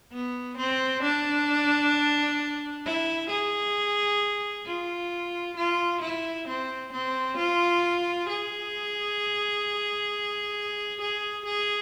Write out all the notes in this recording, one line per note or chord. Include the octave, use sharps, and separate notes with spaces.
B3
C4
D4
E4
G#4
F4
F4
E4
C4
C4
F4
G#4
G#4
G#4